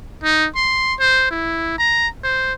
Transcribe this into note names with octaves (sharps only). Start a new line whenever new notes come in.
D#4
C6
C5
E4
A#5
C5